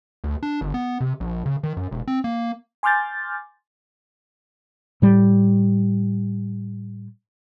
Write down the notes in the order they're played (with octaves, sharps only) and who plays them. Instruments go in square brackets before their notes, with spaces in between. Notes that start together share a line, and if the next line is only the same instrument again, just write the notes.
[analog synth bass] D2
D4
G1
B3
C3
A#1
C#3
D#3
F#2
E1
C4
A#3
[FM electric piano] G#5 C6 D6 F6 G6 A6
[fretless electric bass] A2 G3